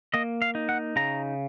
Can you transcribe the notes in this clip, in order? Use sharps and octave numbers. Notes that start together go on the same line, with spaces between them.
A#3 D#5
F5
D#4
F#5
C#3 A#5